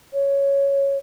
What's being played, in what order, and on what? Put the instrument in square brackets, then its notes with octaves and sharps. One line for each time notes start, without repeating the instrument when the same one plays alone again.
[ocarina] C#5